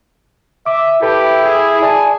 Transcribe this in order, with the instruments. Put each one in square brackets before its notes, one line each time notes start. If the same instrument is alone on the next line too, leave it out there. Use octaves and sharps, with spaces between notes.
[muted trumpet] E5 [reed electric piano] D6
[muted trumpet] E4 [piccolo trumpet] G4 [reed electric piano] A4 B4
[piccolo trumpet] G#4
[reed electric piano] D5 A5 [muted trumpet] G#5